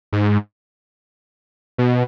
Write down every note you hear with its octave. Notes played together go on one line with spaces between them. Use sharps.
G#2
B2